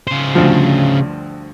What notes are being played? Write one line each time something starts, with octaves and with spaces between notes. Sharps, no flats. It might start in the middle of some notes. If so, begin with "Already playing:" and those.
C#3 C5
D2 G2 F3